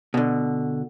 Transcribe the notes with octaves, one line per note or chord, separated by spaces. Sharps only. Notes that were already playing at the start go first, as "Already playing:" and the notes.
B2 D3